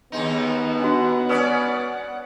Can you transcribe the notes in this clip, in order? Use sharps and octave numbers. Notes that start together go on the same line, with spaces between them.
D#2 G#3 B3 D#4
D4 F#4 F#5
C#4 B4 D5 D#6